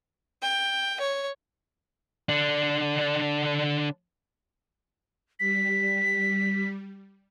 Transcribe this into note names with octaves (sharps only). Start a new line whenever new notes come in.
G5
C#5
D3 D4
G3 B6